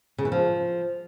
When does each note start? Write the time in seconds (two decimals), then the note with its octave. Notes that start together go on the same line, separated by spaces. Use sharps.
0.18 C#3
0.25 E3
0.32 F3